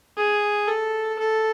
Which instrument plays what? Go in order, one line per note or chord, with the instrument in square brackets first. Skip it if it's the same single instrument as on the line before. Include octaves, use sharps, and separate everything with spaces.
[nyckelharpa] G#4
A4
A4